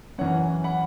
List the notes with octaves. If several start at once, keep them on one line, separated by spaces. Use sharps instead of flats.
F#2 E3 C#4 C#5 F#5
F#5 B5